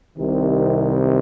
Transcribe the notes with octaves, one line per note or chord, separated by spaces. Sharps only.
C2 C3 D#3